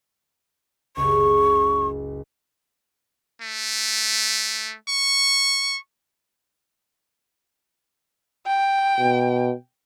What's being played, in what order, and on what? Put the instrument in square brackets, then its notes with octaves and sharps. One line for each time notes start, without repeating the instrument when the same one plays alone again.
[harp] F#1 C#2 [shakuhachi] C#6
[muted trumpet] A3
C#6
[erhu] G5
[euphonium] B2